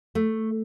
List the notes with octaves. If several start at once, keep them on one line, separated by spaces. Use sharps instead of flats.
A3